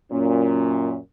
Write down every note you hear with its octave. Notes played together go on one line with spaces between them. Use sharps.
F#2 A#2 C#4